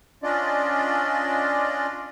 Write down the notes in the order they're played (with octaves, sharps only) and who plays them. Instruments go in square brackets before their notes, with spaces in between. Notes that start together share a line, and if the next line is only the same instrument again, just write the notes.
[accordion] C#4 D4 F4 D5 D#5